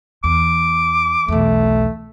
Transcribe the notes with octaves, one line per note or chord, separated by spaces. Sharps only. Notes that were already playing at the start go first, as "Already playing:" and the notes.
E2 D6
B1 E2 A3